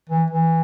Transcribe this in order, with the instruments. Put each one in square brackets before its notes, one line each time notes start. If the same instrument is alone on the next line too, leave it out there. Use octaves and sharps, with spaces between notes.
[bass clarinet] E3
E3